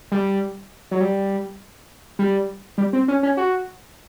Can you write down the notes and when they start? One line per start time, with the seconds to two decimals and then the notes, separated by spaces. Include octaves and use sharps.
0.12 G3
0.91 F#3
1.01 G3
2.19 G3
2.78 G3
2.93 C4
3.08 C#4
3.23 C#4
3.37 F#4